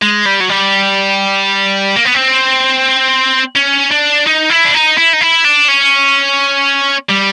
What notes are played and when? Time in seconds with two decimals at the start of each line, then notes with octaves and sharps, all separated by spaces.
0.02 G#3
0.26 G3
0.40 F#3
0.49 G3
1.96 A#3
2.05 B3
2.14 C4
3.56 C#4
3.91 D4
4.26 D#4
4.50 E4
4.64 D4
4.74 D#4
4.97 E4
5.13 D#4
5.21 E4
5.44 D4
5.68 C#4
7.09 G3